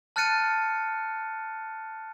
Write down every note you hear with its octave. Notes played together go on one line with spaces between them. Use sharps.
A5 F6 F#6 A6 C#7 D#7